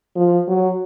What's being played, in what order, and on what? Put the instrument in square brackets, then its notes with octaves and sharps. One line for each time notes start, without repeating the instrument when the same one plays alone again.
[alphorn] F3
F#3